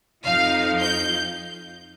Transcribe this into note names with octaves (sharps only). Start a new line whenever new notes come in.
F2 F3 D#4 F5
G6